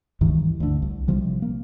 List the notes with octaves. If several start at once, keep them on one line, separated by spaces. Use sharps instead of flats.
C#2 G2 D#3 E3
D2 D3
C2
A#1 C3 F3 G3
A#3